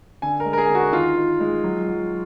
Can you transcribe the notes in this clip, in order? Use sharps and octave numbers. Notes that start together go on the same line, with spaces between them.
D3 G#5
A#4
G#3
A#4
G#4
D3
F#4
D#3 F4
D#3
G#3
F#3
F#3